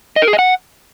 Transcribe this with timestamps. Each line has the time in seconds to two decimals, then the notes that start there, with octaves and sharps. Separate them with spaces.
0.16 D#5
0.22 A#4
0.28 G#4
0.33 D#5
0.39 F#5